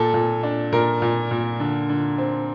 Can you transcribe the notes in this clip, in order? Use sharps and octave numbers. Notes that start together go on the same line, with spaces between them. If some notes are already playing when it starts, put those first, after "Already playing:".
Already playing: A#2 A4
A#2
D4
A#2 A#4
A#2
A#2
D3
D3
C4